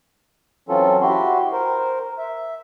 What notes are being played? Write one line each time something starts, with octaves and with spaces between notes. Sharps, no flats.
E3 F#3 C4 C#4 F4 A4
E4 F#4 G4 C6
A#4 C5
E5